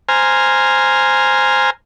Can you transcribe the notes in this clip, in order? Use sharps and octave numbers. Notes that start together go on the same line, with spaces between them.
C5 G#5 A#5 F6